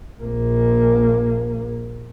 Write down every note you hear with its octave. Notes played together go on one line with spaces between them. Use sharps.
A#1 A#3